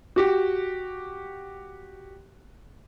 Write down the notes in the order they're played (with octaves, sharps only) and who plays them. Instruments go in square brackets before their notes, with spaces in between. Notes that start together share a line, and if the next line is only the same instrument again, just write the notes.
[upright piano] F#4 G4